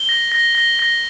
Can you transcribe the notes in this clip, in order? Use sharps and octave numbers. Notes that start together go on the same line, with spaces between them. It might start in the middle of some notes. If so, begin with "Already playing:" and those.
Already playing: G7
A#6
A#6
A#6
A#6